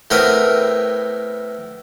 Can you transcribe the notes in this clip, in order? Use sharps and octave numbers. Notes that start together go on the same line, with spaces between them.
A2 B3 C4 A#4 D#6